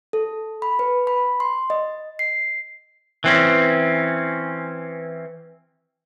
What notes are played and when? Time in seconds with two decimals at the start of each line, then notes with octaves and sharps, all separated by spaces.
0.13 A4
0.62 B5
0.79 B4
1.07 B5
1.40 C6
1.70 D#5
2.19 C7
3.24 E3 C4 C#4